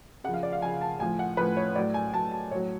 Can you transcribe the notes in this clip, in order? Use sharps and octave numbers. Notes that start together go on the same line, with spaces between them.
C#3 F3 F5 F#5
D5
F5
C#3 F3 G#5
A5
A2 F3 G#5
F#5
A2 F3 B4
C#5
A2 F#3 D5
G#5
A2 F#3 A5
A5
A2 F#3 C#5